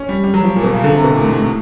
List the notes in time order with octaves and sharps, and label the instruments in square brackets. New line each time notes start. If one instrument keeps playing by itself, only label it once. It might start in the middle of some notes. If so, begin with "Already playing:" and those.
Already playing: [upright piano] C#4
G3
G3
F#3
F3
A#2
B2
C#3
D3
C3
B2
A#2
A2
G#2
A2